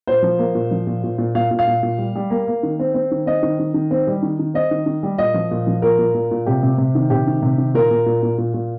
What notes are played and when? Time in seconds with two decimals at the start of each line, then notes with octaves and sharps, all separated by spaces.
0.07 A#2 C5
0.22 F3
0.39 A#3
0.55 A#2
0.71 F3
0.87 A#2
1.04 A#2
1.18 A#2
1.35 A#2 F5
1.51 A#2
1.59 F5
1.67 A#2
1.83 A#2
1.98 G3
2.16 G3
2.30 A#3
2.48 A#3
2.63 D#3
2.79 C4
2.94 C4
3.11 D#3
3.26 C4 D#5
3.43 D#3
3.59 D#3
3.74 D#3
3.91 C4
4.07 G3
4.23 D#3
4.39 D#3
4.54 C4 D#5
4.71 D#3
4.86 D#3
5.03 G3
5.18 A#2 D#5
5.34 F3
5.51 A#2
5.67 F3
5.82 A#2 A#4
5.99 A#2
6.14 A#2
6.31 A#2
6.46 C3 G4
6.63 C3
6.78 C3
6.95 D#3
7.10 C3 G4
7.27 D#3
7.42 C3
7.58 D#3
7.74 A#2 A#4
7.91 A#2
8.06 A#2
8.23 A#2
8.38 A#2
8.54 A#2